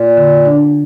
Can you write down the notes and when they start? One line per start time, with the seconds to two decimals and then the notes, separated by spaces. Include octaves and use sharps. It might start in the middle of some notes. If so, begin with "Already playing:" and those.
Already playing: A#2
0.17 D3
0.46 D4